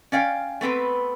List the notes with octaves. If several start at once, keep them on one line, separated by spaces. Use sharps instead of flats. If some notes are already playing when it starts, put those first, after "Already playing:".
C#4 D5 F5 G5
A3 B3 C4 B4